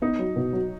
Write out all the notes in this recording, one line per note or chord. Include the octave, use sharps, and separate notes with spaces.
B3 D#4
F#3
B2
F#3